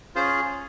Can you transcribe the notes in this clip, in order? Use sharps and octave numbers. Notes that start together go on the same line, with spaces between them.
C#4 F4 G#4 C5